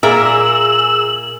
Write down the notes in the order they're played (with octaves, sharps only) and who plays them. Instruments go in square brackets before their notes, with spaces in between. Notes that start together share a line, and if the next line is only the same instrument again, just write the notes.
[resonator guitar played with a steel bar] A#2 A#4 E5 [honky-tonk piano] G#4 A#5 [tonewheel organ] E6 [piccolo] F#7